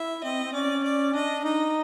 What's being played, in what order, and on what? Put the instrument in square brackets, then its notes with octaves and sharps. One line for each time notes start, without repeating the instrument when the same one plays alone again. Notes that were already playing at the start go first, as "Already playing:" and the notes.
Already playing: [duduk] E4 [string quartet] E5
[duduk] C4 [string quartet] D#5
[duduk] C4
[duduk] C#4 [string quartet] D5
[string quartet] D5
[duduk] D4 [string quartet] D#5
[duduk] D#4 [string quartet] D#5